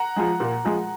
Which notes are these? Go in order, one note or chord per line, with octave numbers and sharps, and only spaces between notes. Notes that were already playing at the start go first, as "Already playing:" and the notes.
Already playing: F#5 A#5
F3 G#3
A#2
F3 G#3